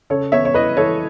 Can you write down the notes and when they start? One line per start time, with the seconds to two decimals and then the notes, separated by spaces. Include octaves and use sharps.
0.10 C#3 A4 C#5
0.32 B3 C#5 E5
0.45 C#5
0.54 E4 B4 D#5
0.77 E3 A4 C#5